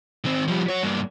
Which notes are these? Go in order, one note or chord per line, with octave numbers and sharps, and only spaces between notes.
D#3 C4
F3 G3
F#4 C#5
G2 A#3